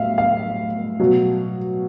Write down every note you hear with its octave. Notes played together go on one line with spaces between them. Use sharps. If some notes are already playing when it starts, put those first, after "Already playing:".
Already playing: A2 F#3 E5 F5
F5
B2 F#3